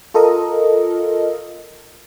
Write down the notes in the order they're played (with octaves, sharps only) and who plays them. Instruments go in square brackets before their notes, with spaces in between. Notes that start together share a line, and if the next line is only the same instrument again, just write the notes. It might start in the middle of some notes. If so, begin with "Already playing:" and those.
[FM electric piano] F4 A4 A#4 D#5